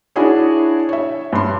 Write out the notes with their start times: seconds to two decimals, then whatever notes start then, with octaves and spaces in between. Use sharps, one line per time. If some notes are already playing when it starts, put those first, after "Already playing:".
0.16 D4 E4 F#4 G#4 C#5
0.89 C#5 E5
1.33 G2 C6